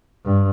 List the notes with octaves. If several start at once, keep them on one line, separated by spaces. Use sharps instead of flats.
G2